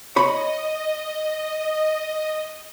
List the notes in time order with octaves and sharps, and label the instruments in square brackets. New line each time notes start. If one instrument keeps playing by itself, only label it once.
[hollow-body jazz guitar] C#5 B5 [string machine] D#5